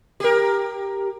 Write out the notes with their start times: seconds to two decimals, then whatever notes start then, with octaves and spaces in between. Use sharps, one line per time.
0.20 G4 A#4